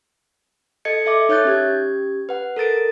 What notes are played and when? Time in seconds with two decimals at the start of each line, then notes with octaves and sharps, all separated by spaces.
0.85 A4 D#5 G#6 C#7
1.06 A4 E5 D6
1.29 D#4 C#5 E5 F#6 G6 A6
1.45 C#4 G4 G#6
2.29 B4 F#5
2.56 A4 A#4 A6 D7